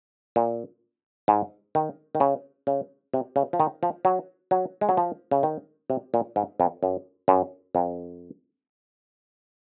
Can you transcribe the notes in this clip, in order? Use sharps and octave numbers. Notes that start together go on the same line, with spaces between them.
A#2
G#2
D#3
D#3
C#3
C#3
C3
C#3
F3
D#3
F3
F#3
F#3
G#3
F#3
F3
C#3
D#3
C3
A#2
G#2
F2
F#2
F#2
F2